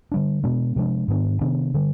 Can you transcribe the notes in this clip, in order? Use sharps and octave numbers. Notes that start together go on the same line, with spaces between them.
D3 G3 D4
B2 G#3 B3 D4
C3 F3 G#3 D4
G#2 D#3 B3 D4
C3 D#3 B3 D4
D3 G3